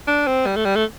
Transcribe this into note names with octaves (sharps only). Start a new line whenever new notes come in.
D4
C4
G3
A3
G3
A3